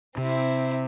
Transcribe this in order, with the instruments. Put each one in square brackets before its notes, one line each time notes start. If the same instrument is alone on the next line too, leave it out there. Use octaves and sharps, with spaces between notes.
[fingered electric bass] C3 [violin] C4 E4